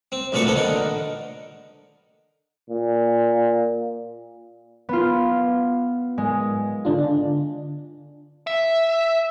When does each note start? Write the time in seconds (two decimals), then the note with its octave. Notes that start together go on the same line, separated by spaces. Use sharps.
0.12 C4
0.32 D2 A#2 F3 C4 B4 C#6
0.44 D3 B3 A4
0.56 D3 D#3 A#4
2.70 A#2
4.89 B3 F4
6.18 G#2 G#3
6.85 D3 D4 F4
8.47 E5